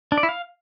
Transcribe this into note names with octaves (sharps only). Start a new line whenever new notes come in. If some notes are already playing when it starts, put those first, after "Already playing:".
D4
D5
E4
F5